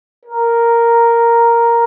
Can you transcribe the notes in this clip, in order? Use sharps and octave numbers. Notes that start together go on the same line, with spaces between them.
A#4